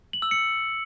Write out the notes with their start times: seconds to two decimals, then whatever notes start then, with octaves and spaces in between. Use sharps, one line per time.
0.13 F#7
0.22 E6
0.31 C#7